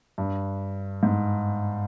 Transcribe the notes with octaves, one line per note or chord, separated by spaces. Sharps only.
G2
G#2